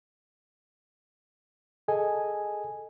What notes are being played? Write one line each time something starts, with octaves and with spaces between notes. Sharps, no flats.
G#4 A4 D#5 G#5